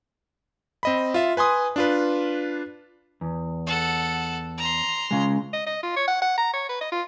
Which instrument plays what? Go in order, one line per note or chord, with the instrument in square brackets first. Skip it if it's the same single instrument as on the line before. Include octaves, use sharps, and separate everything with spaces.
[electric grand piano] C4 D#5 B5
F4 E5
B4 G#5 C6 D#6
D4 F4 B4
[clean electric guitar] E2
[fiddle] A4 F#5
A#5 C6
[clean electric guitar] C#3 G#3
[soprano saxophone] D#5
D#5
F4
C#5
F#5
F#5
A#5
C#5
B4
D#5
F4